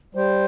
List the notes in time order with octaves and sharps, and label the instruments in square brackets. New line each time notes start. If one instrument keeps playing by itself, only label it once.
[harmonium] G3 [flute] C5